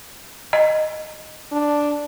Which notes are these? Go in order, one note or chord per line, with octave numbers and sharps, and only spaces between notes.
D#5
D4